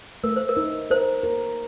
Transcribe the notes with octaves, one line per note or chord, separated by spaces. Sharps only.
A3 A#4
C5
A#4
D#4
A#4 C5
A#4